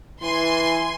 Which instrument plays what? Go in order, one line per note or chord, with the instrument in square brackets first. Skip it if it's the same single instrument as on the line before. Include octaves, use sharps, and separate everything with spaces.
[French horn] E3 [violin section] G#5 C6